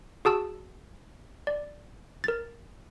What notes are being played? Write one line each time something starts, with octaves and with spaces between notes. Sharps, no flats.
F#4 G#4 A5 E6
D5
A#4 A6